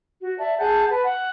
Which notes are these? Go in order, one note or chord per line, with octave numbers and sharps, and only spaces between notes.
F#4
D5 E5 A5
G#4 F#5 A5 G6
B4 A5
F#5